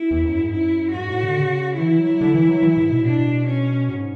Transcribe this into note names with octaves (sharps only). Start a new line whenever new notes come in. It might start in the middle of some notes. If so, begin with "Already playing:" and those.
Already playing: E4
E2
F#2
G#2
F#2 E4
G#2 F#4
A2
D3
C#3
E3 E4
F#3
D3
E3
F#3
E3
G#2
B2
A2
B2 D4
C#4
G#2